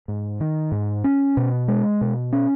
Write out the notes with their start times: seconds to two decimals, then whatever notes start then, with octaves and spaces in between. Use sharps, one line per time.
0.08 G#2
0.40 D#3
0.72 G#2
1.04 C#4
1.37 B2
1.68 G#3
2.01 B2
2.33 C#4